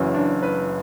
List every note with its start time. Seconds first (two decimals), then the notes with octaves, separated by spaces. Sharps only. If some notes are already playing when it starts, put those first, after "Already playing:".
Already playing: F#1 F#2 E3 C#4
0.14 D4
0.43 B4